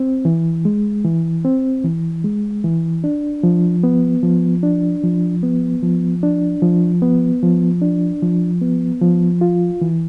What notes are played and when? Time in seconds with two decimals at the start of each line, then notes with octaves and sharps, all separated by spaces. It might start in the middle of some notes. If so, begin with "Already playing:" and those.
Already playing: C4
0.25 E3
0.65 G#3
1.05 E3
1.45 C4
1.84 E3
2.24 G#3
2.64 E3
3.04 D4
3.43 F3
3.83 B3
4.23 F3
4.63 D4
5.03 F3
5.43 B3
5.83 F3
6.23 D4
6.62 F3
7.02 B3
7.43 F3
7.82 D4
8.22 F3
8.61 B3
9.01 F3
9.41 F4
9.81 E3